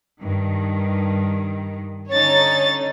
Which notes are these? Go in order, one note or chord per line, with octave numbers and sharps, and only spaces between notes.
G2 D#3
D3 C#4 D#4 C#5 A6